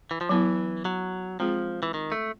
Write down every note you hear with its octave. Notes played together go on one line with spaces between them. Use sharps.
E3
F3
E3 F#3 B3 E4
F#3
F3 G#3 C4 F4 G#4
E3
D#3
A3